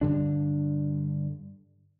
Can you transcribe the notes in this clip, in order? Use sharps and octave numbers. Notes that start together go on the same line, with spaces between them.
G2 D3 D4